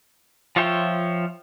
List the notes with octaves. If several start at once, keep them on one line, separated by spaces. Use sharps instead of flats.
F3 F4 C#5 E5 G5